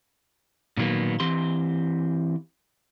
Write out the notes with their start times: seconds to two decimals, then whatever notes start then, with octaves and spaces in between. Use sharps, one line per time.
0.77 A#2 D#3 F#3 A#3 B3
1.20 E3 C4 G4 C6